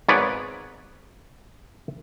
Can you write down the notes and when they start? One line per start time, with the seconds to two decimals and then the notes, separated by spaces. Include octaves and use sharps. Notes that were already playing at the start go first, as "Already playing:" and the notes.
0.08 G#1 G#2 B3 B4 C#5 D5